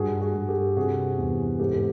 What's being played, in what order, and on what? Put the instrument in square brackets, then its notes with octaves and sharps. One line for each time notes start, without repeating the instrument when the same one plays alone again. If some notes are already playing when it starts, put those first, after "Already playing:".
Already playing: [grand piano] G2 F#4 G#4
F#4 G#4
G2
G4 A4
C3 F#4 G#4
E2
G#2 G4 A4
A4